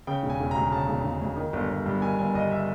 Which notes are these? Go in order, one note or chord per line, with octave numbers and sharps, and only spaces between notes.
C#3 G5
E1
G#5
E1
A#5
D2
C#3 A5
E1
E1
D2
D#3
G1
G1
G2
D#3 G#5
G1 G#5
G1 D#5
E5